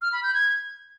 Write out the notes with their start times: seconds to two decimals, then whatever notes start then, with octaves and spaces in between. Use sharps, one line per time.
0.02 F6
0.13 B5
0.23 G6
0.34 G#6